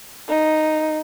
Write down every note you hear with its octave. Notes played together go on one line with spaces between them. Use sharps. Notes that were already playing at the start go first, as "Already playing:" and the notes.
D#4